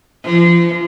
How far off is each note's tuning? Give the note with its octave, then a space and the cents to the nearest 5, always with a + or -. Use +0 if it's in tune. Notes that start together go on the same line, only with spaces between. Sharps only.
F3 -30